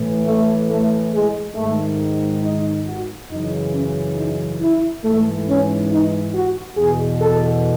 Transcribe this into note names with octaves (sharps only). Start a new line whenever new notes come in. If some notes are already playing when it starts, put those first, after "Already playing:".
Already playing: A2 E3
A3
A3
G#3
G#2 D#3 A3
D#4
F#4
F#2 C#3 E3 D#4
C#4
D#4
E4
G#2 E3 A3
C#4
D#4
F#4
E2 B2 G#4
A4